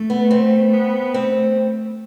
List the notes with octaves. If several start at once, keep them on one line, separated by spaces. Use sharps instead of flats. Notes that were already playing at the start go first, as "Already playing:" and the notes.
Already playing: A3
B3
C4
B3
A3 C4